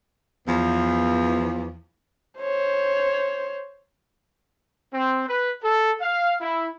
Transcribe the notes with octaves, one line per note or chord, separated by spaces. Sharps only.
E2 F3
C5 C#5
C4
B4
A4
F5
E4